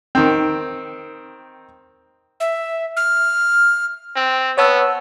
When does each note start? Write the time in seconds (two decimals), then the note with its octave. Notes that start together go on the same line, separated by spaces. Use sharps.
0.15 D#3 C4
2.40 E5
2.97 F6
4.16 C4
4.58 B3 C#5 A5 E6